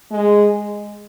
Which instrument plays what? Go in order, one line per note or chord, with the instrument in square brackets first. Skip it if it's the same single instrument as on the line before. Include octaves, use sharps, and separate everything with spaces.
[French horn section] G#3